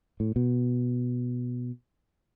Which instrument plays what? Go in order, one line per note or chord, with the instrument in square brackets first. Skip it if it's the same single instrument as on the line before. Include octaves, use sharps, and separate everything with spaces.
[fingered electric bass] A2
B2